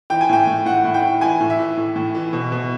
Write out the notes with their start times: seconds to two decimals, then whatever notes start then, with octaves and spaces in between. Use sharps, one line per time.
0.10 E3 G5
0.21 G#5
0.29 A2 G5
0.47 A2
0.65 A2 F#5
0.84 A2
0.94 G5
1.03 A2
1.21 E3 G#5
1.40 A2
1.50 E5
1.58 E3
1.77 A2
1.96 A2
2.15 E3
2.33 B2
2.52 B2